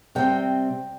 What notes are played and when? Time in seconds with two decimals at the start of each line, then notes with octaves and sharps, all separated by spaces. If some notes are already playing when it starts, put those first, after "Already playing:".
0.15 C3 G3 C4 G5